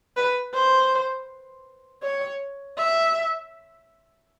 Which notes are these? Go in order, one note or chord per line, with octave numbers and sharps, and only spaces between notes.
B4
C5
C#5
E5